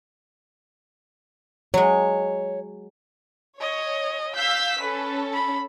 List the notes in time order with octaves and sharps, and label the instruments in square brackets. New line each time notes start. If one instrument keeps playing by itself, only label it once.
[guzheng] F#3 G#3 [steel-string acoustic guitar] C#5
[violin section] C#5 [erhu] D#5
[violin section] F5 E6 B6 [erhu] G6
[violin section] C#4 A4 [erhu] B4
[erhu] B5